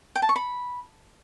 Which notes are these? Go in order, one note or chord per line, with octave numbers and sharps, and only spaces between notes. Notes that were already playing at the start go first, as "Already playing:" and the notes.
G5
A5
C#6
B5